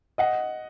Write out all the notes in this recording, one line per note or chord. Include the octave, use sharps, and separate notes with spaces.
D#5 F#5